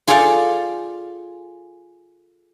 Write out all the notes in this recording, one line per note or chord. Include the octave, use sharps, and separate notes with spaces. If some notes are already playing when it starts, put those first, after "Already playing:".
F4 G#4 A4 D5 F5 G5